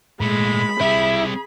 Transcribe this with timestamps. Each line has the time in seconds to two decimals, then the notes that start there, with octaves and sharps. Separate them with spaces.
0.21 A#2 G#3 A3 B5
0.81 G3 C4 E4 G#4